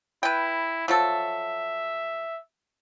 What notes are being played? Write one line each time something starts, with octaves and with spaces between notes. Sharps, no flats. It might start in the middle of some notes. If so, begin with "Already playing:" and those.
E4 B4 G5
F3 F#3 A4 E5